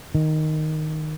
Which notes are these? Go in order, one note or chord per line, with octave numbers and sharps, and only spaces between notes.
D#3